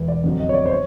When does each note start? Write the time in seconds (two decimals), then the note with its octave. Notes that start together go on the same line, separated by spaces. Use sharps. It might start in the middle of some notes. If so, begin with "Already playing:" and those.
Already playing: E1 E2 E3
0.08 D5
0.24 F2 D3 F#3
0.39 D#5
0.49 C#5
0.54 D5
0.66 C5
0.71 C#5